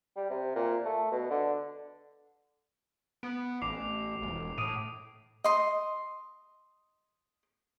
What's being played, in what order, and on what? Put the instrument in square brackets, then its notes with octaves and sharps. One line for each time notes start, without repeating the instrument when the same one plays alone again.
[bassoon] G3
C3
A#2
A3
B2
D3
[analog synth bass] B3 [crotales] D7
[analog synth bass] A1 [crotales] D6 C7 F7
[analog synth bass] E1
[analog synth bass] A2 [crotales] D#6 D7 D#7
[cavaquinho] D#5 C6